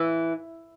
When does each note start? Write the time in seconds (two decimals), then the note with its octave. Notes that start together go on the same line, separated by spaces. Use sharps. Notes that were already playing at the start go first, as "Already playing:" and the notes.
Already playing: E3